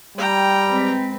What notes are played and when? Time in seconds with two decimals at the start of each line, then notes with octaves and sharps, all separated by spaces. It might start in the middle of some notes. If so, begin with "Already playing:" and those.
0.17 G3 G5 A#5
0.69 G#3 C4 B4